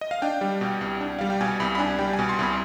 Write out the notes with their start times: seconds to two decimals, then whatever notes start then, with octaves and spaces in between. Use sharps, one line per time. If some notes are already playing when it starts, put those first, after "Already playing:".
0.01 D#5
0.11 F5
0.22 D4 G5
0.41 G3
0.61 B2
0.81 C2
1.01 D4
1.19 G3 F5
1.30 G5
1.41 B2 G#5
1.60 C2 B5
1.75 B5
1.79 D4 G#5
1.99 G3 G5
2.13 G#5
2.19 B2
2.29 C6
2.39 C2 B5